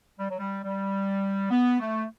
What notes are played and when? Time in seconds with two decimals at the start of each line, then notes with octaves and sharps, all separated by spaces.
0.19 G3
0.30 F#3
0.39 G3
0.64 G3
1.51 B3
1.80 A3